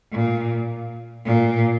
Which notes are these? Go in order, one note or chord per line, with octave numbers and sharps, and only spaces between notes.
A#2
A#2